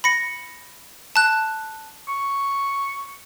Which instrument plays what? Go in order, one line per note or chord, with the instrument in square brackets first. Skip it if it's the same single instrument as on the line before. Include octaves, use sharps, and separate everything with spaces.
[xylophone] B5 A#6 C#7
A5 F#6
[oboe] C#6